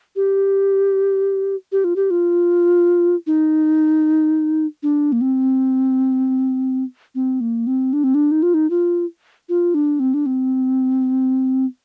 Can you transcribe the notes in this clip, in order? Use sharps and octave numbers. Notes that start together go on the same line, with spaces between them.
G4
G4
F4
G4
F4
D#4
D4
A#3
C4
C4
A#3
C4
D4
C4
D4
D#4
F4
D#4
F4
F4
D4
C4
D4
C4